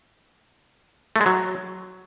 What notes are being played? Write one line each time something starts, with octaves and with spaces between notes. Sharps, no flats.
A3
G#3
F#3